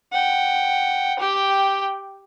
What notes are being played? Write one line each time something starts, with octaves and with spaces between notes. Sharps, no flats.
F#5 G5
G4 G5